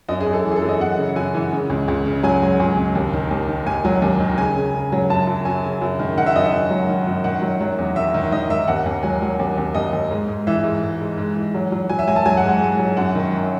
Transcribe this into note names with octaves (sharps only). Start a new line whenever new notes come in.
F#2 D#5
G#4
F#2
A4
E3
G#4
A4
F#2
D#5
F#2 F#5
C#3
F#2 G#5
E3
C#3
C#2
C#2
C#3
F#3 G#5
F#3
C#2
C#2
D#2
D#3
D#2
D#3
D#2 G#5
F#3
D#2
D#3
C#3 G#5
C#3
C#3
F#3
F#2 A5
F#2
F#2 G#5
C#3
F#2
D#3
D#3 F#5
E5
F#2 D#5
E5
F#2
F#3
D#3
F#2
D#3 F#5
F#3
F#3
E2
D#3 E5
D#3
D#3 D#5
D#3 E5
D#2 F#5
D#2
F#3 G#5
F#3
D#2
D#2
D#2 D#5
D#2
G#2
G#2
E3 E5
G#2
G#2
G#2
G#2
E3
F#3
F#3
F#3 G#5
E5
F#3 G#5
A5
F#3 G#5
F#5
G#2
F#5
G#2
F#3
F#2 F#5
D#3
F#2